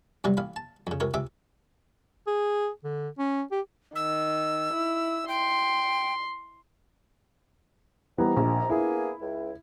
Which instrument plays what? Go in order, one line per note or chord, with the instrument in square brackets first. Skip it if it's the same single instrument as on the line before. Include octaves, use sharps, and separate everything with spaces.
[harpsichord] G2 C3 F#3 G3
A1 F5 B5
A5
F2 C#3
C#2 C3 A#4 C#5
C#2 C3 E5 D6
[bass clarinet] G#4
D3
C#4
G4
[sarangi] D#3 [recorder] E6
[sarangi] E4
[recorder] G5 [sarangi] C6
[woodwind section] D#3 C4 A#5 [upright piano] E3 G3 B3
[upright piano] A#1
[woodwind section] A#3 B3 G#4 [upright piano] E4
[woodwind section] C#2